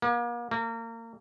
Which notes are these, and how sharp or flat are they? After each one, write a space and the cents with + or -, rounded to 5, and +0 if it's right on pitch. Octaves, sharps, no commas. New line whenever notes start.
A#3 +40
A#3 -30